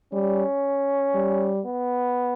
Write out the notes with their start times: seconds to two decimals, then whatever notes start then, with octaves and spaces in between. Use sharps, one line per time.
0.13 G3 C#4
1.15 G3
1.65 B3